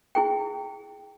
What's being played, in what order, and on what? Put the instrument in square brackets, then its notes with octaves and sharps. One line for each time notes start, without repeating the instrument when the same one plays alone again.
[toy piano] E4 G#4 G5